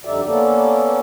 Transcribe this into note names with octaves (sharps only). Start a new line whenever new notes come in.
F2 D3 G3 D#4 D5 E5
A#3 B3 C#4 A4 D5